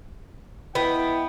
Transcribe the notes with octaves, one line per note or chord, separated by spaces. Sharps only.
B3 E4 D#5 G5